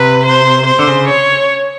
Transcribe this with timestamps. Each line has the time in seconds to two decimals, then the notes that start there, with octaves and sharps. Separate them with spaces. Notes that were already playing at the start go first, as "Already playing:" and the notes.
Already playing: C3 B4
0.25 C5
0.66 C5
0.79 D3
0.87 C#3
1.08 C#5